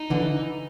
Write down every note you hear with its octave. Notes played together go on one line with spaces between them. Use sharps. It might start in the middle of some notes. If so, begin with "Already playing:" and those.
Already playing: D#4
D3 E3
E3